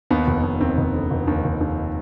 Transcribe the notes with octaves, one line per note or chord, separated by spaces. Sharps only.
D#2 B3
F1
D#2
D#2 C4
F1
D3
F1
D#2
F1
D#2